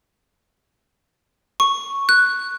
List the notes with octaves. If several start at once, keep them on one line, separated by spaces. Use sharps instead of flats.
C#6
F#6